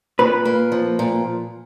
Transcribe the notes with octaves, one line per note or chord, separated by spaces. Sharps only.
A#2 B4
A#3
F3
A#2